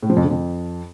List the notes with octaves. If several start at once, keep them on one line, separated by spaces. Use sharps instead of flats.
A2
F3
F2
D3
F2